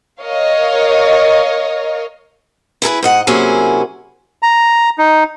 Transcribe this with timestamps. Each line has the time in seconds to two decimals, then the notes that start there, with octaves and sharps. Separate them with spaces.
0.21 A#4 C#5 D#5 F5
2.82 E4 G#4 A4 B4
3.03 G#2 D#5 F#5
3.27 C3 F#3 A#3 C#4 E4 G#4
4.43 A#5
4.98 D#4